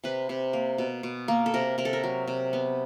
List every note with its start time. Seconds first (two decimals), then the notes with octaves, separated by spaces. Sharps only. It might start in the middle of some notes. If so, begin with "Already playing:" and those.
0.04 C3 B4
0.29 C3
0.53 A#3
0.78 B2
1.03 B2
1.28 A#3
1.46 A4
1.54 C3 A#4
1.78 C3 A#4
1.85 A4
1.93 A#4
2.03 F#3
2.27 C3
2.53 B3